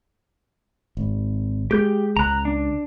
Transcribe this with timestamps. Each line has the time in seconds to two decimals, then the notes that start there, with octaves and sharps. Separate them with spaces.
0.97 G#1
1.71 G#3 G4 G6
2.17 C#2 A#5 F#6
2.45 D4